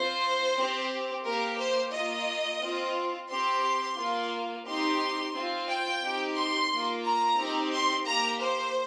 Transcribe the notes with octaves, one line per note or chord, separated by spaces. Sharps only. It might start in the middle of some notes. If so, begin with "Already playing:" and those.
Already playing: C4 F4 C5
C4 G4
A#3 G4 A#4
C5
A#3 F4 D#5
C4 F4
C4 G4 C6
A#3 F4
C4 D#4 G4 C6
C4 F4
G5
C4 D#4 G4
C6
A#3 F4
A#5
C4 D#4 G4
C6
A#3 G4 A#5
C5